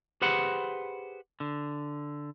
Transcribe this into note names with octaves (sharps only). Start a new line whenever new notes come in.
G4 G#4 B4 C5 F#5 B5
D3